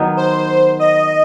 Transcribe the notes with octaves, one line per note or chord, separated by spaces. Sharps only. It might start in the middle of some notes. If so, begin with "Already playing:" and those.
Already playing: D#3 F#3 B3
C5
D#5